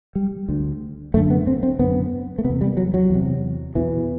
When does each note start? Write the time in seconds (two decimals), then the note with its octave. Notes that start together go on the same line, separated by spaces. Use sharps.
0.15 G3
0.49 D2 D3
1.14 F#2 D3 A3
1.30 B3
1.47 C4
1.63 C4
1.79 F#2 D3 B3
2.38 A3
2.44 C3 B3
2.50 E2
2.61 G3
2.77 F#3
2.94 F#3
3.10 E2 C3
3.75 E2 B2 E3